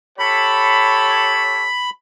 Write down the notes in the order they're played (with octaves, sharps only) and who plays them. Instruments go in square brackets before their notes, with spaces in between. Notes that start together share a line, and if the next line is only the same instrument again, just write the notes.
[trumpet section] G4 A4 C#5 [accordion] B5